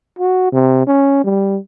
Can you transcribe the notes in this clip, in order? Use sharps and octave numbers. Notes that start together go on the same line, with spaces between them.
F#4
C3
C#4
G3